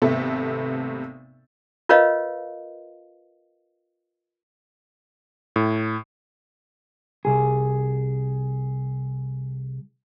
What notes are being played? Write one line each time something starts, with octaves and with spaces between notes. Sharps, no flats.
G#1 C3 A3 B3 A4 E5
F4 A#4 B4 C#5 D#5 F5
A2
C2 G#4